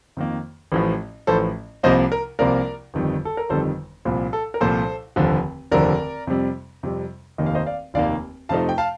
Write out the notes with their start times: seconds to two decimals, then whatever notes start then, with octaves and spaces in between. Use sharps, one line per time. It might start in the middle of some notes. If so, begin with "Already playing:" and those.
0.17 F2 D#3 A#3
0.72 A1 A2 F3
1.27 A1 A2 F3 A4 C5
1.83 C2 C3 F3 A#3 C5 D#5
2.12 A#4
2.39 C2 C3 F3 A#3 A#4 D5
2.94 G1 F2 D#3 G3
3.25 A4
3.37 A#4
3.49 G1 F2 D#3 G3 A4 C5
4.05 C2 A#2 F3
4.33 A4
4.54 A#4
4.61 C2 A#2 F3 A4 C5
5.16 F1 D#2 D3 F3
5.72 F1 D#2 D3 F3 A#4 D5
6.27 F2 C3 G3
6.83 F2 C3 G3
7.38 F1 D#2 D#3 A#3 D#5
7.46 F5
7.55 C5 D#5
7.66 D5 F5
7.94 F1 D#2 D#3 A#3 D5 F5
8.49 F2 C3 F3 A3 D#4 F5 A5
8.69 G5
8.78 F5 A5